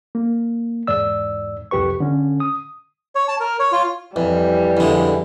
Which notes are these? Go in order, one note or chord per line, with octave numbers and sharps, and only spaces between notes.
A#3
E2 G#2 D5 E6
C2 F2 G4 B4 C#6
D3 C#4
D#6
C#5
A5
A#4
C#5
F4
F2 E3 G3
F2 D3 G#3 E4